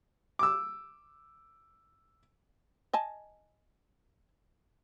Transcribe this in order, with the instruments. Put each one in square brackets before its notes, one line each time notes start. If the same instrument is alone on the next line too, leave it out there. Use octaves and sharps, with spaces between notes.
[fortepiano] D6 E6
[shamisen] D#5 G#5 A5